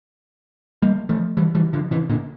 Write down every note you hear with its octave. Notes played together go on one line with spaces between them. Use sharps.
G3 A#3
F3 A3
E3 G3
E3 G3
D3 F3
C3 E3
A#2 D3